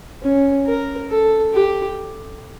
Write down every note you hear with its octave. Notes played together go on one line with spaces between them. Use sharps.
C#4
A#4
A4
G4